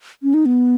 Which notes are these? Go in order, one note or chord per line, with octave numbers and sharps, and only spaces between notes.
C#4
D#4
B3